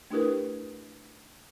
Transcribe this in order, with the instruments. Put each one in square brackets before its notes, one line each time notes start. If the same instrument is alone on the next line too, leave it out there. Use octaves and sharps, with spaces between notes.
[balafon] A3 D4 E4 G4 A#4 B4